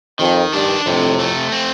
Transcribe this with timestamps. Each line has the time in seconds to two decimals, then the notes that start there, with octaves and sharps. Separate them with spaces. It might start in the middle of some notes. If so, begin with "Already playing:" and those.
0.19 F2 D#3
0.53 G2 D4
0.86 F2 A2 C3
1.19 A3
1.52 C4